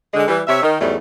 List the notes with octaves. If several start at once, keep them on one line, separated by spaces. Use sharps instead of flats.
D3 G#3
E3 G3
C3 C#5 E5
D#3
E2 G#2 F#3 G3 A3